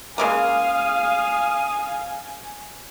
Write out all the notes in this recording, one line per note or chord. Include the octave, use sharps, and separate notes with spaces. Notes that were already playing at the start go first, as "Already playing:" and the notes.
C#3 G#3 A#3 F5 G#5 D#6